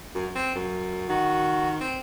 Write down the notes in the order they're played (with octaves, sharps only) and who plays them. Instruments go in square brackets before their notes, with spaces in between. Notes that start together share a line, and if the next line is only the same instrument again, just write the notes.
[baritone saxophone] F#2
C4
F#2
[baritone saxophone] D#3 [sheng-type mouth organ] F#4
[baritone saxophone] C4